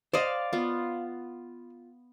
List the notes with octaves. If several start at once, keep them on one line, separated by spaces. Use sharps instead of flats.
C5 D5 D#5 F5
B3 F4